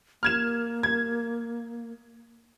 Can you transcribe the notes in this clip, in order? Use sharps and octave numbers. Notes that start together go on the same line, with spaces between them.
A#3 F6 G#6 E7
G#6